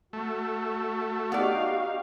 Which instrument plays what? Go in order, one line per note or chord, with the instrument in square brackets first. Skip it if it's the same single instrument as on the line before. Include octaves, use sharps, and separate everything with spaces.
[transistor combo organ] A3 [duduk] F#4
[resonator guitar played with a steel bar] B3 D5 [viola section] D#4 G4 F5